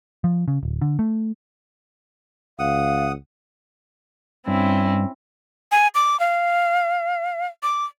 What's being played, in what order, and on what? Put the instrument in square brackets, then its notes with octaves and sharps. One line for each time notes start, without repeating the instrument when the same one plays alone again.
[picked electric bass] F3
C#3
D1
D3
A3
[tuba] C#2 [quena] F5 [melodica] F#5 D#6
[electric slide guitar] G2 [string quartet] C4 C#4 E4
[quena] G#5
D6
F5
D6